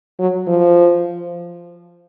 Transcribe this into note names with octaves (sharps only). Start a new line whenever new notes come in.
F#3
F3